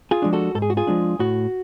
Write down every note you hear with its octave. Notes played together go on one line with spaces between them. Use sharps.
F4 G#4
F3 G#3 D4
F#4 A4
G#2 A4
G#4
F#4
F4 G#4
F3 G#3 D4
A2 F#4